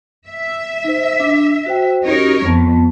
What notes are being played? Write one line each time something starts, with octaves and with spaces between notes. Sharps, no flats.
E5
D#4 C5
D4
F#4 C5 G5
C#4 D#4 F#4 G4 A#4 C#5
F2 B3 A5